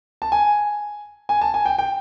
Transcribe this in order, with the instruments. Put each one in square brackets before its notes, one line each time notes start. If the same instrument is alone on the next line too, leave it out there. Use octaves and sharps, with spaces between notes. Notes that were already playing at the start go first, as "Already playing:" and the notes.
[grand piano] A5
G#5
G#5
A5
G#5
G5
G5